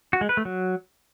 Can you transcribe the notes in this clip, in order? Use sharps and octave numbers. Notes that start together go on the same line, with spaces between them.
F#4
G#3
B4
A3
F#3